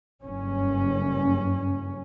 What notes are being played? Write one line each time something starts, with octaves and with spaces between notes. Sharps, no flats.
F#1 G2 C#4